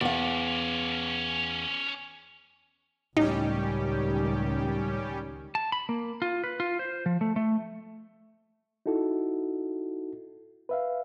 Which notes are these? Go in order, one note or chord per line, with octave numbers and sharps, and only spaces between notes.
E2 C#4 D5 F5
C#2 A2 D#3 G3 C#4 D#4 G4
A5
B5
A#3
F4
B4
F4
C5
F3
A3
A3
D#4 E4 F#4 A4
B4 E5 F5